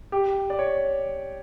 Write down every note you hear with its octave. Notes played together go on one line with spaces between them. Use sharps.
G4
D5
C#5